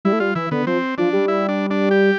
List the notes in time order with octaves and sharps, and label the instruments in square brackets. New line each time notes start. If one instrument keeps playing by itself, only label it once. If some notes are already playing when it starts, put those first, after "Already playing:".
[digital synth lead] G3 [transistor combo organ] E4
[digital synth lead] A3
[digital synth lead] G3 [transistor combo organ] F4
[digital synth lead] E3 [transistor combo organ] E4
[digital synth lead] D3 [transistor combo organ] B3
[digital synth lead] F3 [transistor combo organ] C4
[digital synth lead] F3 [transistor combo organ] D4
[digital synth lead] G3
[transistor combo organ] E4
D4
D4
G4